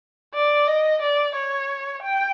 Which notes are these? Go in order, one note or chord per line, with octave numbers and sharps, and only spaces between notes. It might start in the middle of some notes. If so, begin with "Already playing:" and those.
D5
D#5
D5
C#5
G5